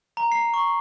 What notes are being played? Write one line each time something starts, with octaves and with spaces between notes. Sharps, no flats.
A#5
C7
C#6